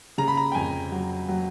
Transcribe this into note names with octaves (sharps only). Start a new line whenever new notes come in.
C#3 A#5
B5
A#5
G5
F2 G#5
F#3
F#3